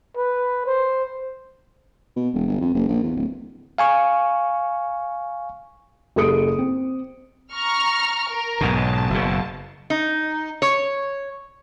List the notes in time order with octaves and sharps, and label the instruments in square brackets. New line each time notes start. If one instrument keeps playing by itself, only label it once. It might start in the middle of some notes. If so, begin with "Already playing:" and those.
[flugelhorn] B4
C5
[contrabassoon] B2
E1
G1
F2
F#1
A#1
E2
D1
[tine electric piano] F5 G#5 C#6
[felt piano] F#1 G4 A4 D#6 C#7 D7
C4
[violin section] A#5 C#6 F6
A#4
[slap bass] B1 G#2 B2 [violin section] A5
[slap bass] F#1 B2
[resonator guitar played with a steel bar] D#4
C#5